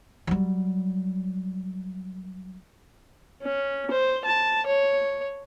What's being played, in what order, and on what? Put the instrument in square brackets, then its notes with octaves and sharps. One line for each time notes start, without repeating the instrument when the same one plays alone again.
[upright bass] F#3 G3
[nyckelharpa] C#4
C5
A5
C#5